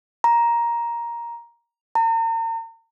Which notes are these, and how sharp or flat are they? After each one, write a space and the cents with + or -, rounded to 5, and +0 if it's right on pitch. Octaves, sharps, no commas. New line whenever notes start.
A#5 +10
A#5 -40